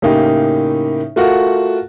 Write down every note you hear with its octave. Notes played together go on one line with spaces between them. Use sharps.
A2 C#3 A#3 D#4 G4
A3 F4 F#4 A#4 F#5